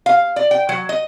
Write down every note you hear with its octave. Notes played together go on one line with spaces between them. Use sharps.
F5
D5
G5
F#3
D#5